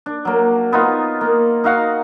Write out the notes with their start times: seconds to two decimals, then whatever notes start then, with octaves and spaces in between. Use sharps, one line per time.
0.06 D4
0.25 F#3 A#3
0.72 B3 D#4 F4
1.21 A#3
1.64 D#4 F#4 F5 F#5